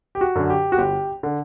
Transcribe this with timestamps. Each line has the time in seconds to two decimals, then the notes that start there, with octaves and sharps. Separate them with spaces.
0.15 G4
0.21 F#4
0.35 F#2 D3
0.50 G4
0.72 F#4
0.78 G1 G4
1.23 D3